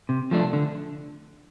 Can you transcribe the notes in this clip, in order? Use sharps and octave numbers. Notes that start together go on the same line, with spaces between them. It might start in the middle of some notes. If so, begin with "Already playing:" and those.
C3
F3 A3 D4
D3